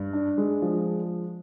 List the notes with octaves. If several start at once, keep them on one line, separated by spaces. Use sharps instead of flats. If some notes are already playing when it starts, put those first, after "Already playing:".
Already playing: G2
D4
G#3
F3